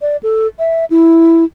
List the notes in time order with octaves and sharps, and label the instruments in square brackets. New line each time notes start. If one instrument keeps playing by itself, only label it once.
[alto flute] D5
A4
E5
E4